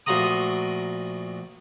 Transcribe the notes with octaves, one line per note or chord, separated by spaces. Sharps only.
A#1 A3 F4 F#4 A#5 D#6